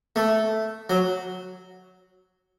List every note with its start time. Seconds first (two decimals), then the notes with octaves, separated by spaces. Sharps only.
0.16 A3
0.90 F#3